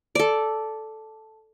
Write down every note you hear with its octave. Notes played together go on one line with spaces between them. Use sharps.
A4 D5